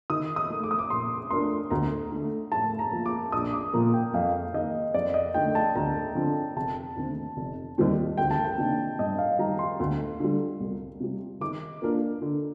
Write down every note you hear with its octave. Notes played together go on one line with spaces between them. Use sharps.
D#3 D#6
D#6
A3 D#4
D6
D#6
D6
A#2 C6
A3 D4 F4 A#4 C6
D2 A#5
D3 A3
A2 A5
A#5
F3 A#3 F4
D6
A#1 D#6
D6
A#2 F3 A#3 A#5
G5
F2 F5
D#3 A#3 D#5
F2 D5
D#5
D3 A3 D#4 G5
A5
D2 A#5
D3 F3 C4
F1 A5
D#2 D3 A3 C4
F1
D#2 D#3 G3 C4
D2 G5
A5
G5
C3 D#3 A#3 D4
G2 D#5
F5
D#3 G3 A#5
C6
D2
D3 G3
C2
C3 G3
D#3 D6
A#3 D4 F4 A#4
D3